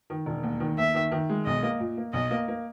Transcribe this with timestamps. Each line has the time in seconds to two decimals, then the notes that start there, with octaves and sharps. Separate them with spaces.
0.10 D#3
0.26 E1
0.43 D#2
0.60 D#3
0.78 D#2 E5
0.94 D#3
1.12 D#3
1.29 G#3
1.45 B1 D#5
1.63 A#3
1.80 A#2
1.97 A#3
2.13 B1 D#5
2.31 A#3
2.48 A#3